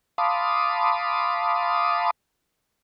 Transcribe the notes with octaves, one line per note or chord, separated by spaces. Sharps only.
F5 A5 B5 C6 D6 D#6